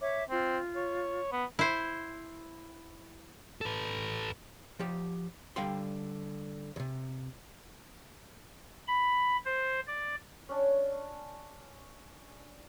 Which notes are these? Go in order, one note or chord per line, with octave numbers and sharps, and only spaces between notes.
C#5 E5 D6
C4 F4
C#5
B3
E4 C5
A4 B4
F3 G4
D3 G3 F5 G5 C6
D2 C3
B5
C5
D5
C#4 D4